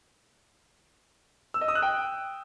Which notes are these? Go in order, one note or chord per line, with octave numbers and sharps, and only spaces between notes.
E6
D#5
D#6
F#6
G5